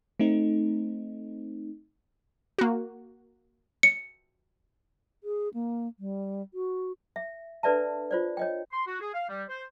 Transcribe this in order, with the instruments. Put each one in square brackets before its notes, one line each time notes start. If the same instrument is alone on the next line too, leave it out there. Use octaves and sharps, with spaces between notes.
[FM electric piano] A3 C4 D#4
[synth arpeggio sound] A#3 F#4
[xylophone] C#7
[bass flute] G#4
A#3
G3
F#4
[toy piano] E5
D4 A4 B4 D5 E5 A5
F4 C5 D5
C#5 D#5 G5
[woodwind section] C6
F#4
G#4
F5
G3
C5